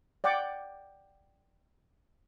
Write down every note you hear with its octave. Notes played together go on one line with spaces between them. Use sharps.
D5 F#5 G5 D6